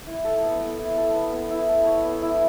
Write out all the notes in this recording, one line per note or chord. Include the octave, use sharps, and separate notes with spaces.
E4
A4
B3
B3
E4
A4
B3
B3
E4
A4
C#5
B3
E4